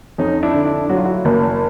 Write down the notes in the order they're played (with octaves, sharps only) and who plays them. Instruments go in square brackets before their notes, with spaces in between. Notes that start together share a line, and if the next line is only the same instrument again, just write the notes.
[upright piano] F2 [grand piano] C#4 D#4
[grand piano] D4 E4
[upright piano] D3
[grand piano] D4 E4
[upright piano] F#3 [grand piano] F#4
[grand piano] F4
E4 F#4
[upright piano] F#1